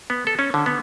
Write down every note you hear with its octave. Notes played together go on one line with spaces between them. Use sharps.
B3
A4
C#4
D3
B3